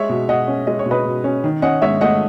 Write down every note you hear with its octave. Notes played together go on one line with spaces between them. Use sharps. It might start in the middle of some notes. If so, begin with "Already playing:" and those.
Already playing: G#3 C#5 E5
B2
B2 D#5 F#5
C#4
G#3 D#5
C#5
B2
B4 D#5
B2
C#4
D#3
C#4 D#5 F#5
G#2 C#5 E5
A3 D#5 F#5